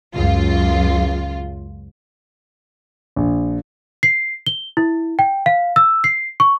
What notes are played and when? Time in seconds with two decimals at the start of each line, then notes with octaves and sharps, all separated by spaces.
0.15 C#2 F#2 F4
3.16 A#1
4.03 C7
4.46 G7
4.77 E4
5.19 G5
5.46 F5
5.76 E6
6.04 C7
6.40 C#6